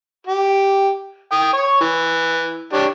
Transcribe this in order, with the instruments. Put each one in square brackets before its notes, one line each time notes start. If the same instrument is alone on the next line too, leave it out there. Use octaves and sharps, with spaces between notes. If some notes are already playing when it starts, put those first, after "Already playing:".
[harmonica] G4
G5 D#6
C#5 C#6
E3
D4 G4 C#5